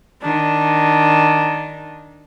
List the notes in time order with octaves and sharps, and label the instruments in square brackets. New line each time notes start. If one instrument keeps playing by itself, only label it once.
[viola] D#3 D4